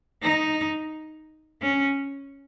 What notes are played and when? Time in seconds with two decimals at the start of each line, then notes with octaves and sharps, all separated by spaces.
0.23 D#4
1.62 C#4